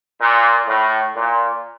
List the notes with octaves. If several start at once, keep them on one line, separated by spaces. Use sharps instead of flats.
A#2
A2
A#2